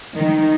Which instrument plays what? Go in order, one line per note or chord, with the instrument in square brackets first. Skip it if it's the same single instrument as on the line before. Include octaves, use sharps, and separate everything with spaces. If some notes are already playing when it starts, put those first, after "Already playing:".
[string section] D#3